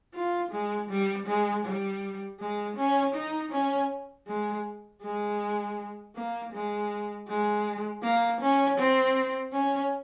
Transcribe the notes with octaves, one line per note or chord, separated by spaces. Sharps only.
F4
G#3
G3
G#3
G3
G#3
C#4
D#4
C#4
G#3
G#3
A#3
G#3
G#3
A#3
C#4
C4
C#4